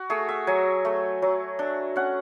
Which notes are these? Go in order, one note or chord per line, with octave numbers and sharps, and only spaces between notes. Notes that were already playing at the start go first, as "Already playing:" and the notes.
Already playing: F#4
A3 G#4
E5
F#3 G#5
A3
F#3
D4
C#4 F#5